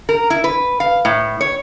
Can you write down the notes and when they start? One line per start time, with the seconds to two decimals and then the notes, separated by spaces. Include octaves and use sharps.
0.09 A#4
0.30 E4
0.44 B4
0.80 F5
1.05 A2
1.41 C#5